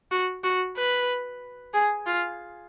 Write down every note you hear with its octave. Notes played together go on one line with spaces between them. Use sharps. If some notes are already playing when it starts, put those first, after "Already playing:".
F#4
F#4
B4
G#4
F4